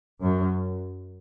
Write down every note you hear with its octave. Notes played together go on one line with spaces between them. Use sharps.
F#2